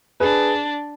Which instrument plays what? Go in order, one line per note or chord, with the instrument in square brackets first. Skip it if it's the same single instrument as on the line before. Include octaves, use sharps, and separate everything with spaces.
[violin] D4 [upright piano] G#4 B4